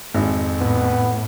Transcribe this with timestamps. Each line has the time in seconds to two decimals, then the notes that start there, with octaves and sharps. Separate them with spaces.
0.14 G#1 F2
0.61 A2 B3